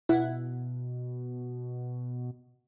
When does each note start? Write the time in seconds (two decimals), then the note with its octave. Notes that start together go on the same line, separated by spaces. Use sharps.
0.09 B2 E4 F#5